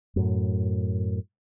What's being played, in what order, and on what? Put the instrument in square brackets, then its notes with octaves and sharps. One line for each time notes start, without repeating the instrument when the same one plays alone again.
[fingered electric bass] F#2 A2